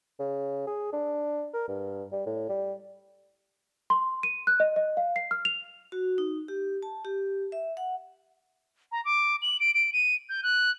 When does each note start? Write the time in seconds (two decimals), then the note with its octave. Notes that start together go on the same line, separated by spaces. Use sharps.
0.19 C#3
0.67 G#4
0.93 D4
1.54 A#4
1.68 G2
2.12 G3
2.26 A2
2.49 G3
3.90 C6
4.23 D#7
4.47 F#6
4.60 D#5
4.76 D#5
4.97 F5
5.16 C7
5.31 F6
5.45 F7
5.92 F#4
6.18 D#4
6.48 G4
6.83 A5
7.05 G4
7.52 E5
7.77 F#5
8.92 A#5
9.05 D6
9.42 F#7
9.60 D7
9.74 D7
9.93 D#7
10.29 G6
10.43 F#6